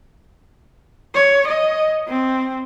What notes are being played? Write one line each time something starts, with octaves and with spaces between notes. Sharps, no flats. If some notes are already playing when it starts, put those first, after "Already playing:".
C#5
D#5
C4